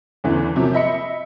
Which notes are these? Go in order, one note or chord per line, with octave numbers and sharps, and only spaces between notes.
E2 D3 E3 B3
C3 F3 F#3 A#3
D#5 E5 B5 C#7